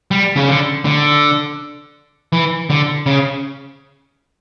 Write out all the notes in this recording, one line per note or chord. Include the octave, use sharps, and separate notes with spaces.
G3
C#3
D3
D3
E3
D3
C#3